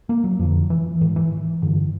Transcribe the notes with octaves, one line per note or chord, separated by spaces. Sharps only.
A#3
F#3
F2 D3 F3
E3
G#2 D#3
E3
G2 D3